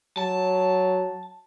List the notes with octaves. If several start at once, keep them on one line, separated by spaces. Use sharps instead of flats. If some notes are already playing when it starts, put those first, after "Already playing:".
F#3 A5